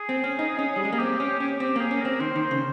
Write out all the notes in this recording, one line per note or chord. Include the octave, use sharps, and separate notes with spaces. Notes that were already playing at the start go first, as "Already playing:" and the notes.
Already playing: G#4
C4
C#4
D#4
C#4
G3
G#3
A#3
C4 G4
C#4 G4
C#4 G4
C4 G4
A#3 G#4
C#4
C4 A#4
D#3 C5
D#3
C5
C#3